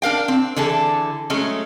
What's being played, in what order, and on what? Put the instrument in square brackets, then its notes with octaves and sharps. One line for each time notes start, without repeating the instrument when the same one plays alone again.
[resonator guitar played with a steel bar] D4 A#4 F5 G5
C4
D3 E3 G#4 A4
F#3 G#3 A3 C#4